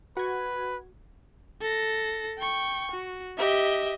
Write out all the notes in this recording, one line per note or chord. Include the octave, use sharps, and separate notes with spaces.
F#4 B4 G#6
A4 A#6
G5 C#6
F#4
G4 D#5 E5